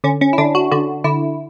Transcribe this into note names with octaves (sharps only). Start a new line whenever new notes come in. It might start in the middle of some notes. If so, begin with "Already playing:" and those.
D3 C#4
C#4
E4
D3 D4
F#4
D3 F#4
D3 E4